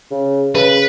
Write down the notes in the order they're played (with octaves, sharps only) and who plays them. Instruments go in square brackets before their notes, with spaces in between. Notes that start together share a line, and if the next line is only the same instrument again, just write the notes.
[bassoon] C#3
[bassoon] C#3 [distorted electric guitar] B4